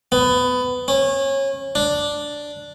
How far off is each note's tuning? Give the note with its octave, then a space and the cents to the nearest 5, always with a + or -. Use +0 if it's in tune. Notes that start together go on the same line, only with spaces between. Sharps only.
B3 +20
C#4 -25
D4 +0